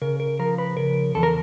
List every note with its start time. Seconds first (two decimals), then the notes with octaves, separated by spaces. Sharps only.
0.02 C#3 A#4
0.20 A#4
0.39 F3 A#4
0.58 B4
0.77 C#3 A#4
1.15 E2 A4
1.23 A#4